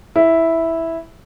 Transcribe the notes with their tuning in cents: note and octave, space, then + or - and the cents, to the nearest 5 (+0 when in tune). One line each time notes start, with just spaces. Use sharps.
E4 -5